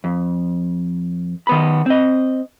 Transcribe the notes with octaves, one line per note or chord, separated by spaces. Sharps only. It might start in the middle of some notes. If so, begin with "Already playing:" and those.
F2
D#3 B3 B5
C4 D#5